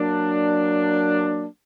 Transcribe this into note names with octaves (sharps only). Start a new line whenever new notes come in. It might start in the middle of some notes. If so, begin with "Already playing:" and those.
Already playing: F#3 A#3 D4